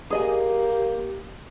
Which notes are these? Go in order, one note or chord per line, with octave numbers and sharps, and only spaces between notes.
A#3 G4 G#4 D#5 G#5